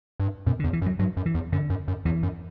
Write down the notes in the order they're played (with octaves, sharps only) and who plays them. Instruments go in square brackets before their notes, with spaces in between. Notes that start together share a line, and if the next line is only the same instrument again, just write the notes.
[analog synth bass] G2
[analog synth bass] F#2 [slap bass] B2
[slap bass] D3
[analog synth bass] E2
[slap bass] E3
[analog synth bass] F#2
[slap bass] F#3
[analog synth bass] G2 [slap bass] F#3
[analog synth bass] F#2
[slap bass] E3
[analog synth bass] E2
[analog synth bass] F#2 [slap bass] D3
[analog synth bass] F#2
F#2
[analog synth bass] E2 [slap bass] E3
[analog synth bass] F#2